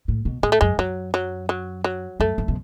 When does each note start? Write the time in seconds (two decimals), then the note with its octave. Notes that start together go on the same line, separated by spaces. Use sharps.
0.08 A2
0.25 B2
0.43 A2 G#3
0.52 A3
0.61 F#2 G#3
0.78 F#2 F#3
1.14 F#3
1.49 F#3
1.84 F#3
2.20 F#2 A3
2.38 F#2
2.48 B2